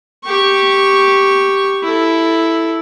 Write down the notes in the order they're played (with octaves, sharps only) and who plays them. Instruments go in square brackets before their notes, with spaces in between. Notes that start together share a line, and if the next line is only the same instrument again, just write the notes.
[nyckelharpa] G4 C#6
E4 A4